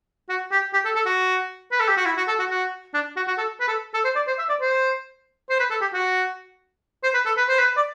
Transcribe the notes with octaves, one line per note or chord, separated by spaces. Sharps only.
F#4
G4
G4
A4
A4
F#4
B4
A4
G4
F#4
E4
F#4
A4
F#4
F#4
D4
F#4
F#4
A4
B4
A4
A4
C5
D5
C5
E5
D5
C5
C5
B4
A4
G4
F#4
C5
B4
A4
B4
C5
B4
D5